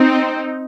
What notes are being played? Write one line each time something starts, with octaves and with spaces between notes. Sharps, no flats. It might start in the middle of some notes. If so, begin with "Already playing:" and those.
Already playing: C4 D#4